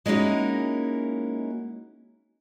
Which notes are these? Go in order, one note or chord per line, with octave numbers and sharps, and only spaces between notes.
G#3 A#3 C#4 D#4 E4 F#4